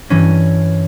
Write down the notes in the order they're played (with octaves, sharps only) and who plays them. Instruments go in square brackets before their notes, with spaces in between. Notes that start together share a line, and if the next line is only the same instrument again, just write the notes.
[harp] G2 E3 C#4 A#6